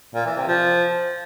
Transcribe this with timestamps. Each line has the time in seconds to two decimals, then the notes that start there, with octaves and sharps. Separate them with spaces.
0.15 A#2
0.26 E3
0.37 C3
0.48 F3